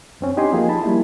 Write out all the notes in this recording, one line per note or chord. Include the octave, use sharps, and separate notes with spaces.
F#2 C4 C#4
D4 D#4 G4 D#5 G#5 C6
F3 A#3 F4 G#4
D#4 A5 B5
G3 A#3 E4